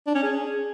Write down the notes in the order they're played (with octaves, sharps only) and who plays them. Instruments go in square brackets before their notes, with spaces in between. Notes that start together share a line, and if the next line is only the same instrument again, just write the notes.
[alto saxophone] D4
C#4
G#4